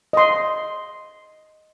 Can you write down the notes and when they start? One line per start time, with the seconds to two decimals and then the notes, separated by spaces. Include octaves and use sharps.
0.13 D#5 C6